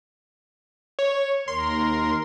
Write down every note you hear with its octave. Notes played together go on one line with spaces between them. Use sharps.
C#5
D#2 A#4 C6